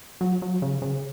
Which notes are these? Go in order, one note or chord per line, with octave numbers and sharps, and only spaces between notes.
F#3
F#3
C#3
C#3